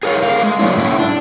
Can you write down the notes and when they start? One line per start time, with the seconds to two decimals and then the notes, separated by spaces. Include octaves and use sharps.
0.03 G#4 A#4 C#5 F5
0.22 A3 F5
0.43 G#3
0.59 F#3 A#3 C#4 D4 E4
0.77 G#2 E4
0.99 D4